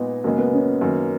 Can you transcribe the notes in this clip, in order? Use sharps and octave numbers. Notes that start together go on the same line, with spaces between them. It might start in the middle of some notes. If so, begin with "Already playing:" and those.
Already playing: A#2 G#3 B3 D#4
F#2 C#3 G#3 A#3
B3
C#4
F#2 D#3 A#3